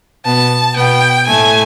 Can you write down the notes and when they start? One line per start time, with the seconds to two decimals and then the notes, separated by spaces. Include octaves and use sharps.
0.25 B2 B3 A5
0.77 B2 B3 G5
1.28 A2 A3 G#5